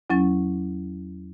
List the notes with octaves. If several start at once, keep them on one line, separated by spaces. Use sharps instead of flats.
E2 F#3 C#4 A6